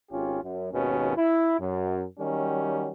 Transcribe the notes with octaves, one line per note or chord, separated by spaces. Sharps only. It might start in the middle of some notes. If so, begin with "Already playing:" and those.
G#1 C#4 F4 G4
F#2
G#1 D#2 B2 C#4
E4
F#2
D#3 F#3 G3 C#4